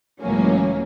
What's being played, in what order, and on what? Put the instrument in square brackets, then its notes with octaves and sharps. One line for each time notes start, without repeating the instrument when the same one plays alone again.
[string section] C#2 A2 E3 F#3 A#3 C#4